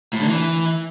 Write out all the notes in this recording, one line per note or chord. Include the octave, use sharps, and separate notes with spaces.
A2
D3
E3